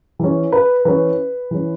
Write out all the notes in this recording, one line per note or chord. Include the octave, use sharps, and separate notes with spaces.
E3 C#4
B4
E3 C#4 B4
E3 C#4